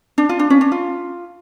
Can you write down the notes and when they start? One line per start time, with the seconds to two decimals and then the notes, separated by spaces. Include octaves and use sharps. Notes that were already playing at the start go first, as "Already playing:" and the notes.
0.18 D4
0.29 F4
0.39 D4
0.50 C#4
0.61 D4
0.72 F4